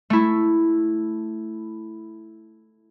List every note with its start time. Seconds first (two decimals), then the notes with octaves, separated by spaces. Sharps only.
0.10 A3 E4